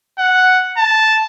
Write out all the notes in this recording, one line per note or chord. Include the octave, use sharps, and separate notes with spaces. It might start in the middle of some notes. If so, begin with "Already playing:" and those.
F#5
A5